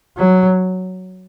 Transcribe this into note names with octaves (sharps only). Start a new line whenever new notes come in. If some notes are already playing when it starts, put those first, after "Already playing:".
F#3